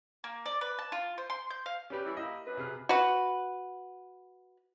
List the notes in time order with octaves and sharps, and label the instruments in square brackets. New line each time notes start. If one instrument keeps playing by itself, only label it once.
[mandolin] A#3
D5
B4
A5
F4
C5
C6
G6
F5
[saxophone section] G3 B4 [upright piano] C#4 G4
[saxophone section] E3 G3 E4
[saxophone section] A#3 E4 G4 [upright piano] D#5
[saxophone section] F#2 B4
[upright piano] C3 G#4 F6
[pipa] F#4 B4